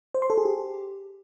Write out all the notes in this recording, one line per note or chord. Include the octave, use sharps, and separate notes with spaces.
C5
C6
A4
G#4
G4